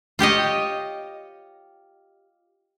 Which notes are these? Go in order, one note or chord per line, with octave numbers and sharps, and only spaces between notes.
F4 G4 C#5 D#5